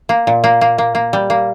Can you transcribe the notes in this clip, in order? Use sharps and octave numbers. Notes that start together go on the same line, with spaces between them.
A#3
A#2
A#3
A#3
A#3
A#3
G3
A#3